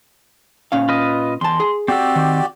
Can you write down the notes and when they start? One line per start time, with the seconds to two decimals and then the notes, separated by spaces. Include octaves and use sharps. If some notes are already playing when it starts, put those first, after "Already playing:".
0.72 A#2 C#4 F5
0.89 F4 B4 D#5
1.41 E2 A5 C6
1.60 G#4
1.88 C4 F#4 G4 D5 E6
2.16 D#3